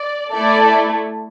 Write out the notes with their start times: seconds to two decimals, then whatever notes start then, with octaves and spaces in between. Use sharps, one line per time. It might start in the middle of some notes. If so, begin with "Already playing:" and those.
Already playing: D5
0.31 A3 E4 A4 D5